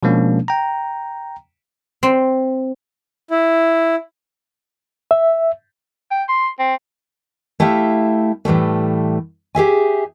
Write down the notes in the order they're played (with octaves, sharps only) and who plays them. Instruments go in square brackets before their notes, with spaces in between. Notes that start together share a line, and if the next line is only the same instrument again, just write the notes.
[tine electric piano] B2 F3 G#3 A#3 C#4 D4
G5 A#5
[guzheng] C4
[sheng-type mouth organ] E4
[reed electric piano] E5
[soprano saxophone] G5
C6
C4
[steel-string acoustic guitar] A3 E4 G4 E5 F5
A2 E3 G3 A3
G4 G#4 E5 G#5